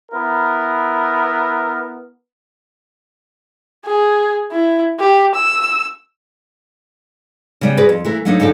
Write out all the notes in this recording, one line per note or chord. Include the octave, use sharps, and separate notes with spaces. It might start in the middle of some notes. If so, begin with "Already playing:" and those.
B3 E4 A#4
G#4
E4
G4
E6
C#3 G3 B3
F#4 G#4 A#4 B4 D5
F2
E3 A3 A#4
F#3 A3 A#3 D4 D#4 C#5
F#2 D3 F#3 C#4 D#4 A4